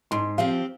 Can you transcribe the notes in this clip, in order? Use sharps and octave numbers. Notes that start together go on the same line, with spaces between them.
G#2 C6
F3 C4 G4 F5